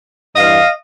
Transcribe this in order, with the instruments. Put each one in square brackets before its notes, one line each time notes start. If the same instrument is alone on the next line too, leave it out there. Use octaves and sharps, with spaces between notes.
[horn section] G2 E3 D#5 F5